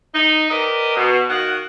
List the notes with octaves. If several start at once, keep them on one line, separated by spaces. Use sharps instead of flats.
D#4
G4 A#4 B4 D5 D#5
B2
D#3 F#4 D#5 F5 F#5